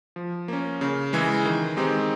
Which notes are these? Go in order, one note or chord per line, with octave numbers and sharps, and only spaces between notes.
F3
A#3 C#4
C#3
E3 G#3
D#3
G#3 C4 D#4 G4